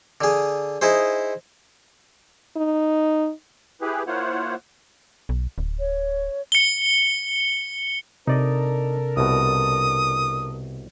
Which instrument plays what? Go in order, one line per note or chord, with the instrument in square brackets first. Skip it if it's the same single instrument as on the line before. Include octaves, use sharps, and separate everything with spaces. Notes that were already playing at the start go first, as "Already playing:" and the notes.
[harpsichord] D3 G#4
D#4 E4 G#4 C5
[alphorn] D#4
[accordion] E4 G4 G#4 B4
A#3 E4 F4 C5 C#5 F#5
[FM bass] B1
D1
[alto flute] C#5
[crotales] C#7 G7
[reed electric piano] C3 [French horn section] D4 A4 A#4 [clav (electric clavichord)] D#4 D5 D#5
[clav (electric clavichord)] C2 B2 [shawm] D#6